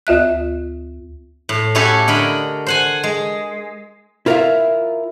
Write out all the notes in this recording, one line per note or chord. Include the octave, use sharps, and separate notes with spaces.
D2 F4 E5 F#6
A2
C#4 E4 F#4 G4 A4 C#5
D3 A#4 D#5 B5
C5 F#5 G#5
G#3
E4 F4 A#4 D5 E5 F5